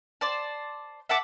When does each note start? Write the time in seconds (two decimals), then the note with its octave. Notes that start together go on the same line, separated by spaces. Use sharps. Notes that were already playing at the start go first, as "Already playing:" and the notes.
0.21 C5 D5 A5
1.09 E5 F#5 A5 D6